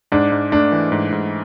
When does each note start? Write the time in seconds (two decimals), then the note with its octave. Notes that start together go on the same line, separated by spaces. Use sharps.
0.12 G#2 D4
0.32 G#2
0.52 A3 D4
0.72 E3
0.92 G#2
1.12 G#2